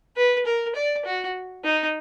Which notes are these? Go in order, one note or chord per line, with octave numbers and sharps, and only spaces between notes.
B4
A#4
D5
F#4
D#4